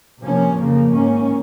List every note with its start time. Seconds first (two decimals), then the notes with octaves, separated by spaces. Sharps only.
0.23 C3 F3 A#3 C#4
0.58 F2 C#3 F3 A#3
0.92 G#2 D#3 A#3 C#4